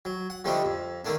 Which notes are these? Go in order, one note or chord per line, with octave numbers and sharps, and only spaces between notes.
F#3
F#5
D3 F3 G3 A3 D4 D#4
F2
D3 D#3 A3 A#3 D4